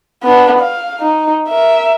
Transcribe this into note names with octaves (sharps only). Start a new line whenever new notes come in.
B3 D4
F5
D#4
A#4 E5